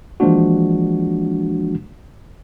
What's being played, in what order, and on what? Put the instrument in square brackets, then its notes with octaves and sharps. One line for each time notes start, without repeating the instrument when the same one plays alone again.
[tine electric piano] E3 F3 G#3 A#3 D4 F#4